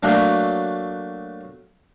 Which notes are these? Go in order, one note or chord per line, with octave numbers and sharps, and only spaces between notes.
F#3 A3 A#3 D4